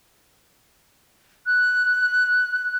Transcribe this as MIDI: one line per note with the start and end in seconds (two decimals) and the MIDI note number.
1.46 2.77 90